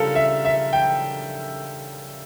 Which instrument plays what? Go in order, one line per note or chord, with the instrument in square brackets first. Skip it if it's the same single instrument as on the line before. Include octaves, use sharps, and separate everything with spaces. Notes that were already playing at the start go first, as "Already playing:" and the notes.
Already playing: [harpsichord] C#3 G3 D4 F4 [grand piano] A4 A#4
[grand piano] E5
E5
G5